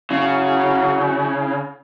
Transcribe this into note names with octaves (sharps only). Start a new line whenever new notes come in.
C#3 F#3 E4